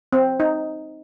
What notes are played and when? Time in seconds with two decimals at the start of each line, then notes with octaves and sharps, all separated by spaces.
0.12 C4
0.40 D#4